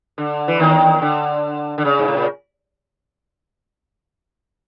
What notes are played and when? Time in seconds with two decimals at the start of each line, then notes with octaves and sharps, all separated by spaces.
0.18 D3
0.48 E3
0.59 D#2 D#3
1.02 D3
1.78 D3
1.85 C#3
1.99 G#2
2.08 A2
2.17 A#2